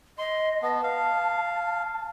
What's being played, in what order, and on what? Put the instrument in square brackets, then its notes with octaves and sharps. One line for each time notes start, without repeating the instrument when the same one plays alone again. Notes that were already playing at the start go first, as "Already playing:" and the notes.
[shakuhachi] D#5 [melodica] C6
[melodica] B3 [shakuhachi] A5
[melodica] F5